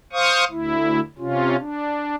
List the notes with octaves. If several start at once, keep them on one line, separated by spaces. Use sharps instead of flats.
C5 F5 C#6 D#6
D2 E4
C3 C#4 F4
D4